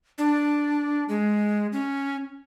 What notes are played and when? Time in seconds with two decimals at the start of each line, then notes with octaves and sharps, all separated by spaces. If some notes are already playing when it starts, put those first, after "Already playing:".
0.18 D4
1.09 G#3
1.73 C#4